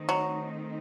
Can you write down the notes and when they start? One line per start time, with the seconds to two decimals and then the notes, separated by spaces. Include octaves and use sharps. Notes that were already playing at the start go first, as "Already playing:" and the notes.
Already playing: D#3 A3 C4 D#4
0.09 F#3